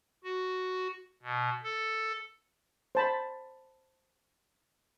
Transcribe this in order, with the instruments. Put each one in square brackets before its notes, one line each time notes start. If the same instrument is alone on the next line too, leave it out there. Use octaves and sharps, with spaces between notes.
[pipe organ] F#4
B2
A4
[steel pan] C5 A5 B5